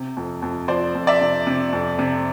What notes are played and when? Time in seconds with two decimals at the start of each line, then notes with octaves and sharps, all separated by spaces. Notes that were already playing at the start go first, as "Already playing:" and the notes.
Already playing: C3
0.17 F2
0.42 F2
0.68 F3 C5 D5
0.95 F2
1.07 D5 E5
1.21 C3
1.47 C3
1.73 F2
1.99 C3